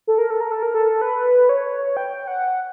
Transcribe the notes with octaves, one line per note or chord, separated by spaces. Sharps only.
A4
A#4
A4
A#4
A4
A#4
A4
B4
C#5
G5
F#5